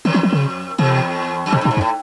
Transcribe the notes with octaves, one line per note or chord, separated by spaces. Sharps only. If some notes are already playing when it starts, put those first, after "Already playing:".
F2 D#3
E3
F3
C#3
E2 C3
F#2
F2 B2
G2
A#2
G#2
F2
A2